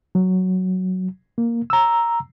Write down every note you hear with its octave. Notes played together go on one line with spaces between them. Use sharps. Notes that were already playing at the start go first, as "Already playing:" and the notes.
F#3
A#3
A#5 E6